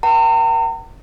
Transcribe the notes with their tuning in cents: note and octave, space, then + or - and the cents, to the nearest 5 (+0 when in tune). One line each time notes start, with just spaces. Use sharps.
B4 -45 G5 -45 A#5 -40